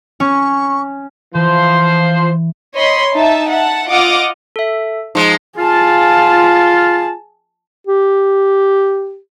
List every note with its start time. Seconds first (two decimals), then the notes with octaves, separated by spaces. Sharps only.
0.20 C#4 C#6
1.34 E3 F3 C5
2.75 C#5 D#5 B5 C6
3.13 D#4 E5 A5
3.48 E5 F#5 A5
3.87 F4 D#5 F#5 D6 D#6 F6
4.56 A4 E5
5.15 F3 G#3 D#4 C#7
5.58 F4 G#4 A5
7.87 G4